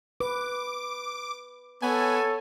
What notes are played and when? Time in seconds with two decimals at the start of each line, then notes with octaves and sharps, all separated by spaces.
0.20 B4 D6
1.82 B3 A4 C#5 G#5 A5